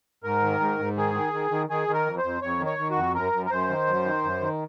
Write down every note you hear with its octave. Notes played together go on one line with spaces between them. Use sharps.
G#2 A#4
D#3
G#2
G#2
D#3 G#4
D#3
D#3
D#3
D#3 G#4
D#3
A#4
F2
F2 C5
F2 C#5
D#3
C#5
D#3
F#4
F2
F#2 A#4
F#2
A#4
F#2 C5
D#3
F#2
D#3
F#2
D#3